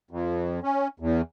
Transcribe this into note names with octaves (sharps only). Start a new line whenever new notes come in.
F2
C#4
E2